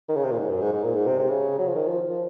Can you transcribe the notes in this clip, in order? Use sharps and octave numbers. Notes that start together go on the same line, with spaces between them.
D#3
C#3
C3
A#2
G#2
F#2
G#2
G#2
A#2
G#2
C3
C3
C#3
F#3
F3
D#3
F3
F3